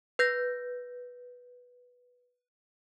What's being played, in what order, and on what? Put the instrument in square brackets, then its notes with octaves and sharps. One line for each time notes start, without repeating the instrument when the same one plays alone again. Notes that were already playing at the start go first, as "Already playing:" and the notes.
[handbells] B4 G6 A#6